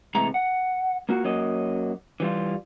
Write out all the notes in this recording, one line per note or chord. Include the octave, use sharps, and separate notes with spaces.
A2 C3 E3 G#3 A3 A#5
F#5
A#3 F4 F#4
F#2 F#3 A#3 D#5
E3 G3 F4